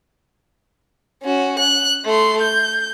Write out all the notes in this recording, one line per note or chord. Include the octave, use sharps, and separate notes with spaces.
C#4 F#4
F#6
A3 C6
G6